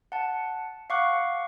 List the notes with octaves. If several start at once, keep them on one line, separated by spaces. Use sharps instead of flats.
F#5 A5
F5 F#5 C#6 D6 F#6